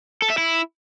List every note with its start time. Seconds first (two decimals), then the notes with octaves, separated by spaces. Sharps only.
0.22 A4
0.30 E5
0.38 E4